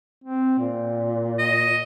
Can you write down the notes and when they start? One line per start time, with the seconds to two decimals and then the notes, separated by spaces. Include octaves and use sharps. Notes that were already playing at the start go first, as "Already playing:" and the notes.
0.24 C4
0.59 A#2
1.39 D#5